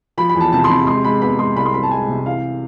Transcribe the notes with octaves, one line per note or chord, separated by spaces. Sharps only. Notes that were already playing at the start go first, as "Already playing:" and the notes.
F3 B5
B5
E2
A5
C3 A5
C6
C3 B5
G#3 C6
G#3 B5
B3 B5
G#3 C6
C2 B5
C6
C4 B5
A5
G#3 G#5
C3
E3 F5